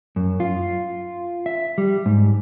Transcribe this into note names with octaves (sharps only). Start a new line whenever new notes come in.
F#2
F4
E5
G3
G#2